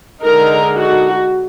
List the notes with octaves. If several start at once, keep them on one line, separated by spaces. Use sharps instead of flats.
D3 G#3 D#4 A#4
F#4